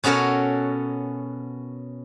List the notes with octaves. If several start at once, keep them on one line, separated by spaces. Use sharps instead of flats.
B2 C#4 F#4 A4 A#4 C#5